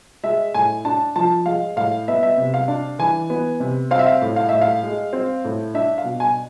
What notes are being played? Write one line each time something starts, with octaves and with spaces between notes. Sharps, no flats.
G#3 E5
A2 G#5
D4 A5
F3 A5
G#3 F5
A2 F5
B3 E5
E5
C3
F5
D4
E3 G#5
B3
C3
C4 F5
E5
F5
A2
F5
A2 E5
F5
G#3
C4
A2
D4 E5
F5
B2
G#5